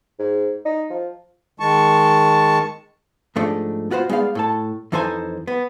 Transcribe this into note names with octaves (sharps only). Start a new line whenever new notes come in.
G#2
D#4
F3
D#3 G#3 A5 C#6
G#2 F3 A3 D4 D#4
B3 F4 F#4 A#4 C5
G#3 B3 D#4 D5 F5
A2 A4 A5
F2 E3 D#4 A4 C5 G#5
B3